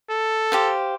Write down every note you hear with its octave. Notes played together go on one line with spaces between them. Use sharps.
A4
G4 C5 F5